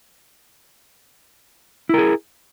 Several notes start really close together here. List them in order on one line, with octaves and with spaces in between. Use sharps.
E4 A#4 G#4